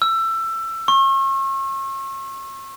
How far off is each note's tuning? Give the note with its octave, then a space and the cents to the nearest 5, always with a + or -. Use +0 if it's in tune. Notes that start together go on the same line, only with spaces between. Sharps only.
E6 +20
C#6 -40